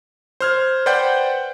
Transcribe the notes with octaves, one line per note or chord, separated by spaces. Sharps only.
C5 F6 G#6
B4 C5 D5 F#5 G5 G6